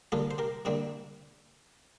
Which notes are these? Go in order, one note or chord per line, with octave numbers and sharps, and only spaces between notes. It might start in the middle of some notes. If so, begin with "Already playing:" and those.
G2 D3 G3 A#3 F4 A4
C5
G4 A#4
G2 D3 G3 A#3 C4 E4